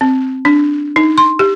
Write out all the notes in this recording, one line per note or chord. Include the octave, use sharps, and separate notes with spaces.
C4
D4
D#4
C6
G4